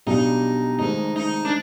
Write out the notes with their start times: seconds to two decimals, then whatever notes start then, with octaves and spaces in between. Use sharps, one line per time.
0.06 B1 B2 G3 D4 D#4 G4
0.79 F1 F2 D#3 G#3 C4 D#4
1.16 D#4
1.45 D4